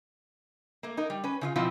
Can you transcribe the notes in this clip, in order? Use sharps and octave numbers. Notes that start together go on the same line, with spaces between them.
A3 A#3
D#4 A#4
G3
C#4 B4
C#3 E4 F4
B2 F3 C4 E4 F4